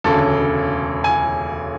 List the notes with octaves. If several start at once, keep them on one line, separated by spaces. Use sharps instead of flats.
E1 D2 C#3 A4
G#5